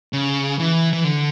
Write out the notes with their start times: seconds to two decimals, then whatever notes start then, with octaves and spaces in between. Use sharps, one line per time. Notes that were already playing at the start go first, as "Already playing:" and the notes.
0.13 C#3
0.59 E3
0.93 E3
1.04 D3